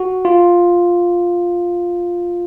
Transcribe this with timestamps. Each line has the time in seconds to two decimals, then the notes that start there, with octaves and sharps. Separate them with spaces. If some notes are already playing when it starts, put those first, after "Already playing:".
Already playing: F#4
0.25 F4